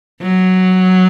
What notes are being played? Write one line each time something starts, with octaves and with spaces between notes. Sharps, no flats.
F#3